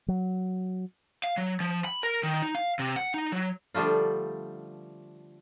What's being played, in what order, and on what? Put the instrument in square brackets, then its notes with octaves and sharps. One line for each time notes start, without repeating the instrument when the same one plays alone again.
[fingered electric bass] F#3
[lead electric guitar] F5
F#3
F3
B5
A#4
D#3
D#4
F5
C3
F#5
D#4
F#3
[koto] D3 F3 G3 A3 F4